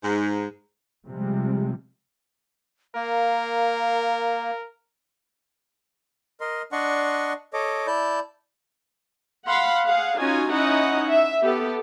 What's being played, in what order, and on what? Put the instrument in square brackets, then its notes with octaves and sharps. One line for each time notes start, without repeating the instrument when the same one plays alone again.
[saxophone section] G#2
[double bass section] C3 F3 G3 G#3
[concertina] A#3 [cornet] A#4 [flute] F5
[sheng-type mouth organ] A#4 D#5 C6
D4 D5 D#5 F#5 C6 C#6
A4 C#5 D#5 D6
E4 D5 A5 G6
[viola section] F5 F#5 B5 C6
G#4 F5 F#5
C#4 D#4 F4 F#4 G#5
C#4 D#4 E4 D#5 F#5
E5
B3 G4 A4